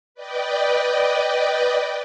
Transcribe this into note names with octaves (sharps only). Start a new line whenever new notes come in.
B4 D5 D#5 G5